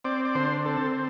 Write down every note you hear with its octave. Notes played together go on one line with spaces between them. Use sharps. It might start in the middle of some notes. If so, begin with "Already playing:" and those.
C4 D5
D5
D3 C5
C4 A4